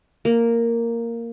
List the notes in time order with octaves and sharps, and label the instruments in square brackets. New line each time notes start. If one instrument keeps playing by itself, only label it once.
[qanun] A#3